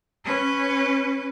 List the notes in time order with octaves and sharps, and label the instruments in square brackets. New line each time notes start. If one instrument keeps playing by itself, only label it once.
[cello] C#4 B4